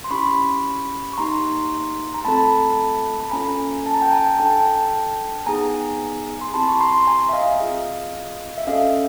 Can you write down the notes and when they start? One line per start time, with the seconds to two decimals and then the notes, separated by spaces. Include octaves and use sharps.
0.04 C6
0.10 C#4 E4 G4 B5 C#6
1.13 C#6
1.18 A#3 D#4 G4 A#5 C6
2.14 A#5
2.25 A3 C4 F4 A4 A5 B5
3.21 B5
3.31 A#3 C#4 F4 A4 G#5 A#5
3.86 A5
3.94 A#5
4.02 G5 A5
4.12 G#5 A#5
4.39 D4 F#4 A4 G5 A5
5.46 B3 D#4 G#4 G#5 A#5
6.41 C6
6.53 C4 E4 G4 A5 B5
6.69 C#6
6.80 A#5 C6
7.07 G#5 A#5
7.29 E5
7.33 D#5 F5
7.60 C4 F4 G#4
8.58 E5
8.67 C#4 F#4 A4 D#5 F5